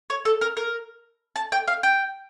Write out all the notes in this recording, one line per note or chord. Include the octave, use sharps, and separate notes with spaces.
C#5
A4
A#4
A#4
A5
G5
F5
G5